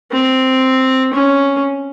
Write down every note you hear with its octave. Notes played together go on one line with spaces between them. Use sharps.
C4
C#4